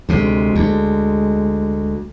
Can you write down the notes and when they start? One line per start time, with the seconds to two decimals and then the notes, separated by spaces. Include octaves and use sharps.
0.09 D2 C3 G#3
0.55 D2